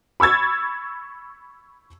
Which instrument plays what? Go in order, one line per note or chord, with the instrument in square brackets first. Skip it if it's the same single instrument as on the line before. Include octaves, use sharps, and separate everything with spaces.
[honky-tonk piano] B5 C#6 E6 G#6 A6